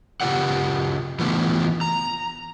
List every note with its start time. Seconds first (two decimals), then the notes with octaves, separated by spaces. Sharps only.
0.21 C#3 F4 G4 G#4 D5 F#5
1.19 E3 A3 B3 D4 E4 F4
1.81 A#5